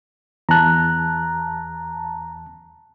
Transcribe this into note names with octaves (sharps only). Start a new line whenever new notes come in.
E2 A5 A#5 F#6